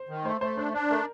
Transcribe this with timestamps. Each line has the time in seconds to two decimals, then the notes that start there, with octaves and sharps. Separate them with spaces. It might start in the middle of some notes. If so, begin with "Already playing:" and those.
Already playing: C5
0.09 D#3
0.25 A3 C5
0.41 A3 C5
0.57 D4 C5
0.73 D4 D5
0.90 A3 A#4